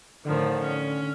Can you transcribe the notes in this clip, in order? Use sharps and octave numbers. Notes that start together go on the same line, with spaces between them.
A2 D3 D#3 F3
C#4